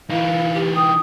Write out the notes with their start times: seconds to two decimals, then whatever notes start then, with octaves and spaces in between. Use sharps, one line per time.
0.10 E3 D#4 E4 F5
0.54 G4
0.75 G5 D#6